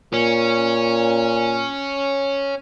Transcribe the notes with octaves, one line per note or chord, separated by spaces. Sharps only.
A#2 C#4